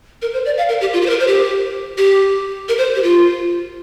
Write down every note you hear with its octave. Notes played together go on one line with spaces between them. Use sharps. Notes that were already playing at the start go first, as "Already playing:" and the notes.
A#4
C5
D5
F5
A#4
G4
F4
G4
C5
A#4
C5
G4
G4
A#4
C5
G4
F4